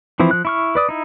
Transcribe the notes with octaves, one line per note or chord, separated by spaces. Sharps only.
E3 F3 C4 E4
F3 F#6
E4 C#6 F6
B4 D5 D#6
D#4 E4